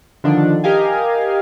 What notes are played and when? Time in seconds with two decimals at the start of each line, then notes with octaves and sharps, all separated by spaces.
0.24 D3 D#3 F3 D4 D#4
0.64 G4 A#4 D#5 F5 G#5